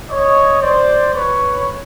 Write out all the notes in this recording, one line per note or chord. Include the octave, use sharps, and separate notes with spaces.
C#5 D#5
C5 D5
B4 C#5